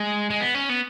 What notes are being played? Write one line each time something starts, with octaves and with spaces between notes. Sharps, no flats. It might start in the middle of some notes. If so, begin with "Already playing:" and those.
Already playing: G#3
G#3
B3
C#4
B3